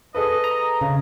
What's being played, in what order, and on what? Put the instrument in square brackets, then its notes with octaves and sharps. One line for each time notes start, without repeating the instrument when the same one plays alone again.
[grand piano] G#4 A4 B4 [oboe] D#5
[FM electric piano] A#5
[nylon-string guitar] C#3